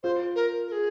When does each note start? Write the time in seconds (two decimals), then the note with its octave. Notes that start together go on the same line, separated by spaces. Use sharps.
0.03 F4 C5
0.36 A#4
0.67 A#4
0.72 G#4